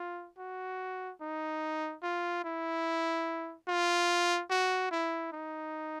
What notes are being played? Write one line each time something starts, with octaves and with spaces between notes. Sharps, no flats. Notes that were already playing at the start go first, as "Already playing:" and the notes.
Already playing: F4
F#4
D#4
F4
E4
F4
F#4
E4
D#4